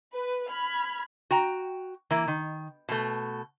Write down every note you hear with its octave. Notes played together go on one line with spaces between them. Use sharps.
B4
B5 F6 G#6
F#4 G5 A#5
E3 A#3
D#3
B2 A3